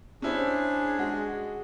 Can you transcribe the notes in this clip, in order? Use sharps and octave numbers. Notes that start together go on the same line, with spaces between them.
C#4 D4 E4 G#4 C5
G#3 F#4